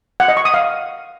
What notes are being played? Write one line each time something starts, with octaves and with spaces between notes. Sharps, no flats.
F#5
D#5
C#6
D#6
F5